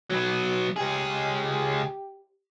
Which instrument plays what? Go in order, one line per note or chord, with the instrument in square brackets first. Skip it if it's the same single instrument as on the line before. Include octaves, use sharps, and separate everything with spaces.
[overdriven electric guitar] F#3 B3
[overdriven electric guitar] C#2 G#4 [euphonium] G4